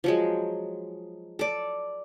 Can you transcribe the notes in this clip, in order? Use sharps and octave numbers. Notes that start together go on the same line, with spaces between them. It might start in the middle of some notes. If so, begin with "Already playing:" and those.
F3 F#3 G#3
A4 D5